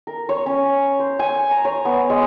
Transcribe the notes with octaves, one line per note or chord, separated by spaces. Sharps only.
A#4
C#5
C#4
C5
G#5
A#5
C#5
B3
G#3